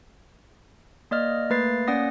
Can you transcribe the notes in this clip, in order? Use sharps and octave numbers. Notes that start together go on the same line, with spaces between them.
A#3 D5 D#5 F6
A3 A#3 B4 A6 C7
A#3 C#4 D5 F#5 D#6 A#6